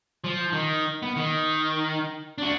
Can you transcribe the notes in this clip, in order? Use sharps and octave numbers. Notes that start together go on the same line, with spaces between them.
F3
D#3
B3
D#3
D4 F#4